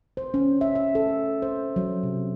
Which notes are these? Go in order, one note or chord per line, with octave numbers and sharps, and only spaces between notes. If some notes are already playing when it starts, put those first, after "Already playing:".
C5
C#4
E5
E5
A4
C5
F#3
C3